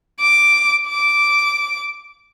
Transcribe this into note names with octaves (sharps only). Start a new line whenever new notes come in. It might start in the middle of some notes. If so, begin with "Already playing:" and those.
D6
D6